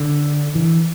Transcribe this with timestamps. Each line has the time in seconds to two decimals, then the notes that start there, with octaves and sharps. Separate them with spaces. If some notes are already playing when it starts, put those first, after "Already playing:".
Already playing: D3
0.55 E3